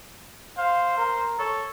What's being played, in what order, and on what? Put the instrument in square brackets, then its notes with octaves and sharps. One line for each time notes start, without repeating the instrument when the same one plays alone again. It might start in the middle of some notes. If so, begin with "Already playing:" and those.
[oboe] C5 [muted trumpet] F5
[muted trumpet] A#4
[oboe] A4 [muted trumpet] C#5